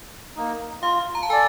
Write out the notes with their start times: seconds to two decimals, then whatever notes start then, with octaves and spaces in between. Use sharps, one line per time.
0.36 A#3 D#4
0.82 F4 F5
1.15 A#5
1.23 A5
1.30 A4 D5 G#5